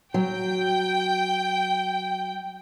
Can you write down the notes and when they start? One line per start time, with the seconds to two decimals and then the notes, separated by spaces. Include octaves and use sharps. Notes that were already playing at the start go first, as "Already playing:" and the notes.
0.14 F#3 G5